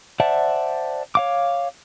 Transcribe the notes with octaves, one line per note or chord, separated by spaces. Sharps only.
C5 D5 E5 F#5 A5
C#5 F5 D6